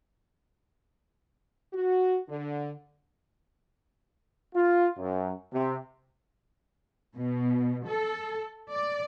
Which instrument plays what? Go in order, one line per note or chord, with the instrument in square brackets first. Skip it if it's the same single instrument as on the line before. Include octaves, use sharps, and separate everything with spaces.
[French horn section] F#4
D3
[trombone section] F4
F#2
C3
[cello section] B2
A4
D5